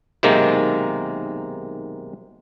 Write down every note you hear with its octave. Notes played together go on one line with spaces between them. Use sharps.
B1 C3 D#3 G#3 A#3